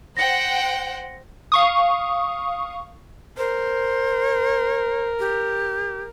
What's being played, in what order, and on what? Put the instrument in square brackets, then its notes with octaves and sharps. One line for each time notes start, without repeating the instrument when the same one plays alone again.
[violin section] C5 F#5 G5 [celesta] A#6 C#7
[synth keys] F5 C#6 D#6
[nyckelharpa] A#4 [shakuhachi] C5
[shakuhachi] G4